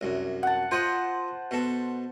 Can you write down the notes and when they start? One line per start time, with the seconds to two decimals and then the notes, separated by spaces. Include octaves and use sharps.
0.01 C2 F#2
0.43 F#5 A5
0.71 F4 C5 D#5 F#5
1.51 B2 A4